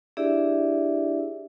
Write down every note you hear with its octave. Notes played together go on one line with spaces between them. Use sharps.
D4 E4 G4 G#4 D5 E5